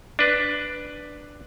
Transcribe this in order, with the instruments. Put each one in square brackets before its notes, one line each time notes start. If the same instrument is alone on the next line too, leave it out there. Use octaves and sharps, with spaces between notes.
[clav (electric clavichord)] D4 B4